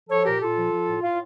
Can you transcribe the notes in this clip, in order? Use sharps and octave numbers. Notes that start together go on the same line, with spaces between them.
F3 A4 C#5
A#2 G4 A#4
A#2 F4 A4
F3
F3
A2
A2 F4